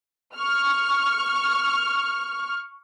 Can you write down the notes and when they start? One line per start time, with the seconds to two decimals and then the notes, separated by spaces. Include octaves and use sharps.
0.36 C#6 F6